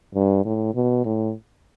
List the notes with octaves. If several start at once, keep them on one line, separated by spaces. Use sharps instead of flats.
G2
A2
B2
A2